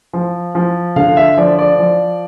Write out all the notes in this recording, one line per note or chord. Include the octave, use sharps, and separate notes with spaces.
F3
F3
D3 F5
E5
F3 D5
D5
F3